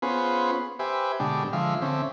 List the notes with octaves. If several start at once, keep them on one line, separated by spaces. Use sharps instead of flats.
B3 C#4 F4 G#4 B4 C5
G4 B4 C5 E5 G#5
B2 D3 G#3 D4 G4
D3 F3 G#3 E5 F5
D3 C4 C#4 E5